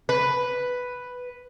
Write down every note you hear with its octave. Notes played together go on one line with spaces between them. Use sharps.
B4